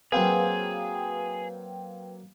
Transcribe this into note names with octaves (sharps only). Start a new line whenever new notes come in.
F#3 A#3 C4 G#4 B4 F5 G5